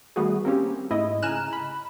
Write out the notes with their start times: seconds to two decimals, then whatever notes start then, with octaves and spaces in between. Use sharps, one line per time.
0.16 D#3 G3 A3 B3 F#4 G#4
0.45 A#3 C4 C#4 G4
0.91 G#2 A3 E4 D#5
1.22 C#3 G#5 A#5 F6 F#6 E7
1.53 B5